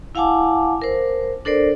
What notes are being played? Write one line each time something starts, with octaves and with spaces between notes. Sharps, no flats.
E4 F5 F#5 G#5 A5 D6
A#4 C5
D4 A4 A#4 C5 D5